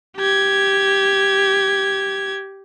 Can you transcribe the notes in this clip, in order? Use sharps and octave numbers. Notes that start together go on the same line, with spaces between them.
G4 G#6